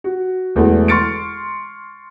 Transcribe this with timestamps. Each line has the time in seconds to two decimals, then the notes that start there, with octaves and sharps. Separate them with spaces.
0.04 F#4
0.55 E1 E2 E3 A3
0.88 C6 C#6 F6 A6 C#7 D7